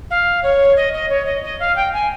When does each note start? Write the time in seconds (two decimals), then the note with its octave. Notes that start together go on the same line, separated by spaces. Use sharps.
0.10 F5
0.43 C#5
0.76 D#5
0.93 D#5
1.09 C#5
1.26 D#5
1.43 D#5
1.59 F5
1.76 G5
1.93 G#5